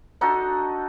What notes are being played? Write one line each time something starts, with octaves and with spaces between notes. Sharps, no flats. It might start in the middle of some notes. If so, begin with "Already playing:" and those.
D4 D#4 F#4 A4